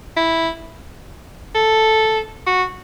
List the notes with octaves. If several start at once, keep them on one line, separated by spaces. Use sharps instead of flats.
E4
A4
F#4